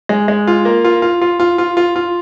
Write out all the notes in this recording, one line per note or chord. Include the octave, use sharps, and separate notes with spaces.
G#3
G#3
F4
A#3
F4
F4
F4
F4
F4
F4
F4